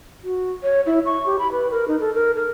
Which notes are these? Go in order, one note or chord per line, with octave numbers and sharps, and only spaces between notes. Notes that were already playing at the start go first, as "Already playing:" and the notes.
F#4
C#5
E4
C#6
G4
B5
B4
A#4
D#4
A4
A#4
A#4